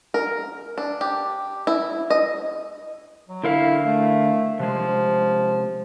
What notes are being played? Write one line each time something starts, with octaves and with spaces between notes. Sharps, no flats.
A#4
D4
G4
E4
D#5
F#3
D3 E4 A#4 F5
A3
C3 F3 G#3